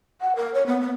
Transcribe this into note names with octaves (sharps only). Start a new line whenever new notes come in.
F#5
A#4
C#5
B3
B3